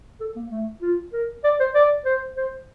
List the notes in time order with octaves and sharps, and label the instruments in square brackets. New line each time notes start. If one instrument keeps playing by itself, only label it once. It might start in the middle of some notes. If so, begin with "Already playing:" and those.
[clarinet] A4
A#3
A3
F4
A#4
D5
C5
D5
C5
C5